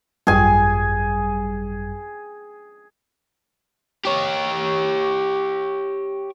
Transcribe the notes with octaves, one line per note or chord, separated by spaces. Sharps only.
G#1 F#2 G3 G#4 G#5
G4 C#5